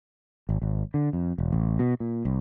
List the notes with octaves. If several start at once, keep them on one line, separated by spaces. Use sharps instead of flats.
G#1
G#1
D3
F2
E1
A1
B2
A#2
C2